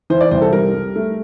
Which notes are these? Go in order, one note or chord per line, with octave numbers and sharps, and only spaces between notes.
E3 C5
D5
C2 C5
A4
G3 A#4
G3
A3